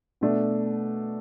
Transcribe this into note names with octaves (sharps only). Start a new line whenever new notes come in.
B2 A3 D4